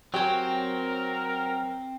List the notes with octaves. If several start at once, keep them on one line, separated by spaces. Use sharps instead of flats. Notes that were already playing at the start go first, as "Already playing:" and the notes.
F#3 C4 G4 A#4 C#5 G#5